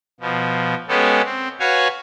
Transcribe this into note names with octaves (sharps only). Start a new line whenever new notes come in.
B2 F3
G#3 B3 C#4 G4 A4
C4
F#4 B4 C#5 F5 G#5